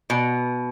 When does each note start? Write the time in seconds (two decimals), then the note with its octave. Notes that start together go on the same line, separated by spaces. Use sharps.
0.10 B2